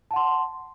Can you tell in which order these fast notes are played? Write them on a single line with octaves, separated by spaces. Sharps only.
A5 F#5 C6